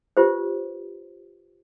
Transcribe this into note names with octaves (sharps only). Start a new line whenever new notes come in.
F4 G4 B4 C5